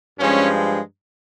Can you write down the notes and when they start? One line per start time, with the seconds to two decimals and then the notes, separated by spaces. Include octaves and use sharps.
0.19 G2 F3 G#3 C#4